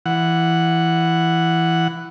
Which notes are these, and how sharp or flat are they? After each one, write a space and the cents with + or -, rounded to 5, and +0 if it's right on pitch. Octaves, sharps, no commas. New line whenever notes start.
E3 +10 F#5 +0